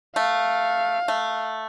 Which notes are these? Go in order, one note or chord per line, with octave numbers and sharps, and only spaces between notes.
A3 F5
A3